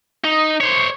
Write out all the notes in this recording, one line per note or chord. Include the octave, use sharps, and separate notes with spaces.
D#4
C5 C#5